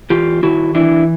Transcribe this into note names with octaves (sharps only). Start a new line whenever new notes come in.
E2 F4 G4
D#3 E4 F#4
E3 D4 E4